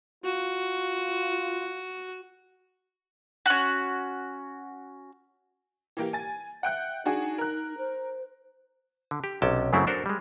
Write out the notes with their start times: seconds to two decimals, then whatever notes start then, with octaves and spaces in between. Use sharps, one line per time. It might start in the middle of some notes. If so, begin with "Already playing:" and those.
0.24 F4 F#4
3.46 C#4 F#4
5.97 E3 A#3 G4
6.13 G#5 A6
6.63 E5 F#5 G5 F#6
7.06 D4 D#4 F#4 G#4
7.38 A#4 F#6
7.78 C5
9.11 D3
9.24 G4
9.42 B1 C3 C#4 G5 A5
9.73 F#2 C#3 F#3 A3 C4 E4
9.87 D4 F#4 A4 A#4 C5
10.06 G3 G#3